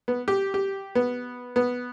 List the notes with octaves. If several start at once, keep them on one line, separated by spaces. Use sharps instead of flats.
B3
G4
G4
B3
B3